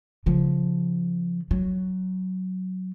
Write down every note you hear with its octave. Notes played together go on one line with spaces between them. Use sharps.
C#3 F3
F#3